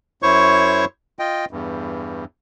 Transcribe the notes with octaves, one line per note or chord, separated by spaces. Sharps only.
F#2 E4 C5 C#5 C#6
F4 D#5 G5
E2 G2